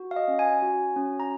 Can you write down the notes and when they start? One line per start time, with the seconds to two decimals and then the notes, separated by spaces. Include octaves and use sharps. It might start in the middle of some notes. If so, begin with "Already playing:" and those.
Already playing: F#4
0.11 F5
0.16 D#5
0.28 C#4
0.39 G#5
0.62 F#4
0.96 C#4
1.20 A#5